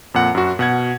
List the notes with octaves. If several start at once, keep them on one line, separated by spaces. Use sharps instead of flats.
F2 A#2 F#5
F#2 F#4
B2 F#5 G#6